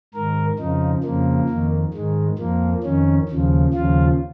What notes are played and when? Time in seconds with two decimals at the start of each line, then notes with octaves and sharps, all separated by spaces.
0.14 G#2 D#3 A#4
0.59 F2 C#3 F3 D#4
1.04 F2 C#3 F3 A#3
1.49 F2 D#3
1.94 G#2 D#3 G#3
2.39 F2 F3 A#3
2.83 F2 D#3 C#4
3.29 D#2 C#3 F3
3.73 D#2 C#3 F3 F4